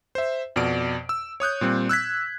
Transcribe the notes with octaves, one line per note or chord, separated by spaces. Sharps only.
C5 E5
F2 B2 D5 D7
E6
C#5 D#6 F#6 G6
A#2 G3 C4
E6 F#6 G#6 B6